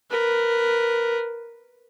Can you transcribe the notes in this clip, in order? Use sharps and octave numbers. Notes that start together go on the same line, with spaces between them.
A#4 B4